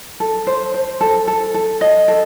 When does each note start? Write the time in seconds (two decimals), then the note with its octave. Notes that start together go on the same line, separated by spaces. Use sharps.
0.20 A4
0.47 C5
0.74 C5
1.01 A4
1.27 A4
1.54 A4
1.81 D#5
2.08 A4